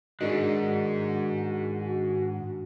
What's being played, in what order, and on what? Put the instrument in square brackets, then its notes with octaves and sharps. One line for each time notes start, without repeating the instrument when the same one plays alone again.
[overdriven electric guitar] G#2 G#3 [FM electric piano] D#3 D4 [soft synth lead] F#4 [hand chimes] G#4 A#4 D#5